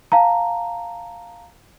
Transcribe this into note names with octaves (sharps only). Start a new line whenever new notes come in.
F5 A5 A#5